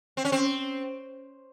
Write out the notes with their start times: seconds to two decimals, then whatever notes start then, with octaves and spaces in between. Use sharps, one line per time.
0.17 C4
0.25 C#4
0.32 C4